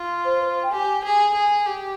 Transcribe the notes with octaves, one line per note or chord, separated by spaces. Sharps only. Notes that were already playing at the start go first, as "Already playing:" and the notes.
Already playing: F4
C5
G5
G4 G#5
G#4
G#4
G4